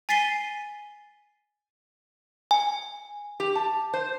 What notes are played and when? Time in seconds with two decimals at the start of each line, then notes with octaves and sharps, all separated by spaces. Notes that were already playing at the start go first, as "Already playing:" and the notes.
0.09 G#5 A6 B6 C7 D#7 G7
2.51 G#5
3.40 G4
3.55 A5
3.94 C5